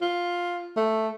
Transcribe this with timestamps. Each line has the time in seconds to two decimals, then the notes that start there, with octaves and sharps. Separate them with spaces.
0.01 F4
0.76 A3